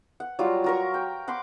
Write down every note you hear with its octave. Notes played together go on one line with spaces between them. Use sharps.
F#5
F#3 G3 F4
F#4 A#4 C#6
G5
F#5 B5 C6 D6